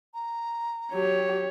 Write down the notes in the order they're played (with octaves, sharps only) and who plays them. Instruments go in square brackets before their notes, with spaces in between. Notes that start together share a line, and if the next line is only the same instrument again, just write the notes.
[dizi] A#5
[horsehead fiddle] F#3 G4 [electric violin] C#5